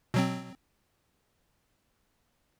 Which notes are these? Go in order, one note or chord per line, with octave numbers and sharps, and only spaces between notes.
B2 F#3 C4